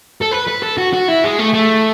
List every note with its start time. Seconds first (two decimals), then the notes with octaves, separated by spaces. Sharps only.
0.22 A4
0.33 B4
0.48 B4
0.63 A4
0.78 F#4
0.93 F#4
1.08 E4
1.24 G#3
1.39 A3
1.54 A3